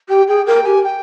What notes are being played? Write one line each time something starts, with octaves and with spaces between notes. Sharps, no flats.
G4 G5
G#4 G5
A#4 G5
G4 G#5
G5